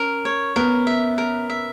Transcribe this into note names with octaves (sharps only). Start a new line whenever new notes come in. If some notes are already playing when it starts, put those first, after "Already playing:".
Already playing: C#4 A#4
C#5
B3 A#4
E5
A#4
E5